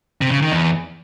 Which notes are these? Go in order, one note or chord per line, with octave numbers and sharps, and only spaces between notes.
C3
C#3
D#3
E2